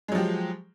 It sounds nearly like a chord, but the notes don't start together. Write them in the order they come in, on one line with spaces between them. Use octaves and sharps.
G#3 F#3 F3 G4